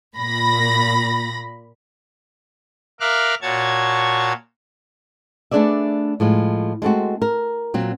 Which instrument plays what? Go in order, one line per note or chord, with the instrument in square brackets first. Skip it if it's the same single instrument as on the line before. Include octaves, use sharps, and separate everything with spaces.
[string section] A#2 B5 A#6
[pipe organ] A#4 E5 F5 D6 F6 F#6
A#2 F#4 C#5 A5 G#6
[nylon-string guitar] A3 B3 D4 G#4 D5 E5
A2 F3 G#3
G#3 A3 C4 F#4
A#4
A#2 F#3 C4